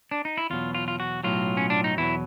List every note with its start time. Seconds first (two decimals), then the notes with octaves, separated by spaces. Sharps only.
0.11 D4
0.25 D#4
0.38 E4
0.50 E2 B2 F#3 F4
0.75 F4
0.88 F4
1.00 F#4
1.24 B1 A2 F#3 F4
1.57 C#4
1.70 D4
1.84 D#4
1.97 E2 B2 F#3 E4